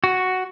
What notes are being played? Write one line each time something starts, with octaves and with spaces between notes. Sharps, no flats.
F#4